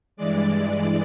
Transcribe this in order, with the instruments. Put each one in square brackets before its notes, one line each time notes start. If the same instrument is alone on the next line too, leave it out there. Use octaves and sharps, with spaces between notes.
[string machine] G2 E3 G#3 D5